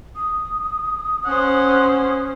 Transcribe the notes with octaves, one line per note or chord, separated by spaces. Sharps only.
D#6
C#4 C5 F#5